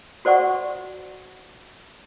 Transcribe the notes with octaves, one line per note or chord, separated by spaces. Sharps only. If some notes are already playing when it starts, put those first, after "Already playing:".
F#4 C5 D5 F#5 C#6